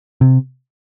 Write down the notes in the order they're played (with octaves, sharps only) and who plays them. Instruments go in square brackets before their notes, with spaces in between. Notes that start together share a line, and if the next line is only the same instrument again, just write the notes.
[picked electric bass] C3